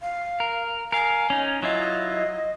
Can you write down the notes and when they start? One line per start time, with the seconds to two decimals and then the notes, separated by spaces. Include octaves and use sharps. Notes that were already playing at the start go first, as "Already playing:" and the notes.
0.01 F5
0.40 A#4
0.92 A#4 F5 G#5
1.30 C#4 D#4
1.63 F#3 E4 F4 D#5